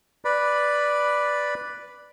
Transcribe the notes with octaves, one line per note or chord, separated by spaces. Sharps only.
B4 D5 B5